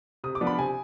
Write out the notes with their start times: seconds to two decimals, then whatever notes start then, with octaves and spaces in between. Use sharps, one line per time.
0.24 C3 D#6
0.35 D6
0.41 F3 B3 D4
0.47 B5
0.58 C3 G#5